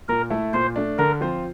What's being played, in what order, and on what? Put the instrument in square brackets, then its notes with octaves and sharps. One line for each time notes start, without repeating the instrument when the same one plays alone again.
[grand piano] A#2 [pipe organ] A#4
[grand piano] A3 E4 A4
[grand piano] A#2 [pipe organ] C5
[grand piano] A3 D4
[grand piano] D3 [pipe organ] A#4
[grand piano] F3 C4 F4 C5